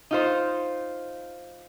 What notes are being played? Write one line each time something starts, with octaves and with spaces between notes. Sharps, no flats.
D#4 F4 C5